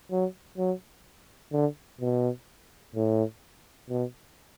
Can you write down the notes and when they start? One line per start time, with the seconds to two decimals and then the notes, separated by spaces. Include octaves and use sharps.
0.11 F#3
0.58 F#3
1.52 D3
2.01 B2
2.95 A2
3.90 B2